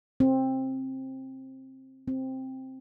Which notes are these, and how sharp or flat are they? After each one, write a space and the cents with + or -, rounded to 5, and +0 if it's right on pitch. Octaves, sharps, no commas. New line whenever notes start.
C4 +15
C4 +5